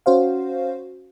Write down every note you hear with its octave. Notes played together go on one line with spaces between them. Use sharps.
C#4 F#4 C5 F5